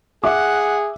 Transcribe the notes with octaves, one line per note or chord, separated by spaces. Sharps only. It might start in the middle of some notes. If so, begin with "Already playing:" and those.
G#4 E5 F#5 D6